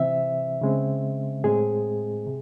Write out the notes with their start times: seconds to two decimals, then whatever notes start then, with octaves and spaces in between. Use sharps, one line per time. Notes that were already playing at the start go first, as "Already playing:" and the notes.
Already playing: C3 E3 C4 E5
0.61 C#3 G#3 C4
1.44 A2 G#3 C4 G#4
2.27 C3